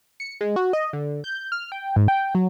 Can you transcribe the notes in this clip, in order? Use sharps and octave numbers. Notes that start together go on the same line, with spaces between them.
C#7
G#3
F#4
D#5
D3
G6
F6
G5
G#2
G5
F#3